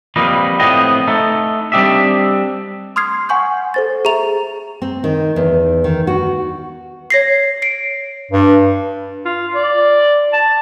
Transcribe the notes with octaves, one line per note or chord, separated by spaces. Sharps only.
F3 G3 A#3 C4 B4 D#5
A2 B3 C4 D#5
A3 D#4 A4
G3 C4 D4 G4 D#5 E5
C6 D#6 F6 G#6 C7
F#5 G#5 C#6 G6
A4 C5 A6
G#4 E5 A#5 F7
C4
D#3
E2
D#3
F#4
C#5 A#6 C7
C7 D7
G2
F4
D5
A5